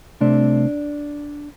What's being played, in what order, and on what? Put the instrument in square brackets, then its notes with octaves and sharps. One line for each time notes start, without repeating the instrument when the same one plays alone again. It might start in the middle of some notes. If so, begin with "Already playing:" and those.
[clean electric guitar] C2 C3 A3 C4 D4